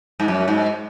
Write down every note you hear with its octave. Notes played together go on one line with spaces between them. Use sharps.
G#2
F#2
G#2